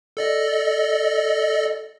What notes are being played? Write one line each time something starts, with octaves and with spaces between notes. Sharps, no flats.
A4 D5 D#5